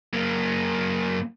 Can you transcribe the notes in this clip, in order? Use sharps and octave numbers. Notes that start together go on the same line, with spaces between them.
F#2 A#3